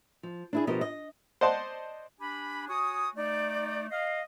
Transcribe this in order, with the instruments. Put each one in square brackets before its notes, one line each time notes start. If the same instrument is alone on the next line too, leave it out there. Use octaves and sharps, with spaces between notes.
[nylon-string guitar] F3
D4 E4 G#4
B2 F3 G4 A#4 D#5
D#5
[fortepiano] C5 D5 D#5 F#5 A5 C6
[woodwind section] D4 G4 G#5 B5
F#4 C#5 G#5 D#6
A3 D#4 D5
D#5 F5